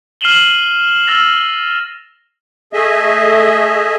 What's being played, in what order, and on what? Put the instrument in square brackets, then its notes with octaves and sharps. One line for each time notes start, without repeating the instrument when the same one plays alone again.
[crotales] F6 C7 D#7 E7 F#7 G7
E6 F6 A6 A#6 F7
[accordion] A3 G#4 D#5 E5